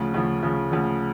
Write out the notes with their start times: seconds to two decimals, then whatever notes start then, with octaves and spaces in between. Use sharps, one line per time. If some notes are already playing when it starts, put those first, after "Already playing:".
Already playing: D2 C#3 F3
0.14 D2 C#3 F3
0.42 D2 C#3 F3
0.72 D2 C#3 F3